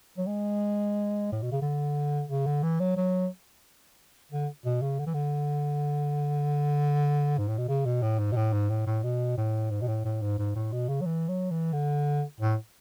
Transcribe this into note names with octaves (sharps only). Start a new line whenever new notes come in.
F#3
G#3
A2
B2
C#3
D3
C#3
D3
E3
F#3
F#3
D3
B2
C#3
D3
E3
D3
G#2
A2
B2
C#3
B2
A2
G#2
B2
A2
G#2
A2
A2
B2
A2
G#2
B2
A2
A2
G#2
G#2
A2
B2
C#3
F#3
E3
F#3
E3
D3
A2